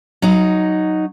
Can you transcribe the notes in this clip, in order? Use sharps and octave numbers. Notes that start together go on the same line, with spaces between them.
F#3 D#4